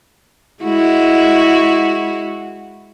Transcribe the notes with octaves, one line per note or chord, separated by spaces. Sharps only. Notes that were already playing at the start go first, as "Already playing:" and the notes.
G#3 E4 F#4